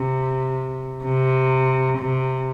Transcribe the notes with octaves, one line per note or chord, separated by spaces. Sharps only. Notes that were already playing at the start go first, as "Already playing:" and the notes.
Already playing: C3
C3
C3